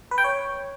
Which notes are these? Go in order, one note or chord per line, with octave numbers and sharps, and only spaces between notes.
B4
G5
C#5